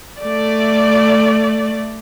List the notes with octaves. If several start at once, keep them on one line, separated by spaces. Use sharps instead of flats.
A3 D5